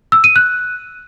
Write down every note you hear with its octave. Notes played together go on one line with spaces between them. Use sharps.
E6
D#7
F#6